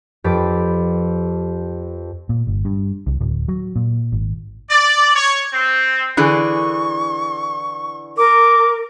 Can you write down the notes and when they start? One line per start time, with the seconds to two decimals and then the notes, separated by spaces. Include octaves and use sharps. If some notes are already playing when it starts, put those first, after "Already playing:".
0.24 F2 G4 B4 D6 A6 B6
2.29 A#2
2.47 G1
2.65 G2
3.07 C2
3.21 D1
3.48 F#3
3.76 A#2
4.12 G#1
4.70 D5
5.15 C#5
5.52 C4
6.17 D3 E3 G#4 C#6
8.17 A#4 D6